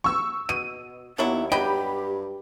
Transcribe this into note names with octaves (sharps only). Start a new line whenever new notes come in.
C#6 E6
B2 D#7
D#2 D3 F#3 B3 E4
G2 F#3 G4 D#5 G5 B5